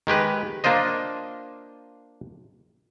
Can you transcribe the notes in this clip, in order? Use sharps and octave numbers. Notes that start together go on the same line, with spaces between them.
D#3 G#3 G4 B4
A#3 D4 F4 C5 D#5